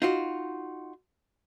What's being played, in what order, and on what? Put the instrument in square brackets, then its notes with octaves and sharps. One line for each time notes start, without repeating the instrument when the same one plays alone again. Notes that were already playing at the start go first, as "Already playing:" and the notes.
[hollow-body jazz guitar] D#4 F4 F#4